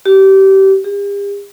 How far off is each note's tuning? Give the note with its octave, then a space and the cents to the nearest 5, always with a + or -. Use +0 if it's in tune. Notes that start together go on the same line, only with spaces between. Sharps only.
G4 -25
G4 +45